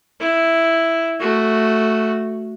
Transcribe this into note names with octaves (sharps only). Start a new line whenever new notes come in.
E4
A3 F#4